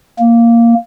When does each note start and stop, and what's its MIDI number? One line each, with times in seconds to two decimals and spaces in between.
0.19 0.74 58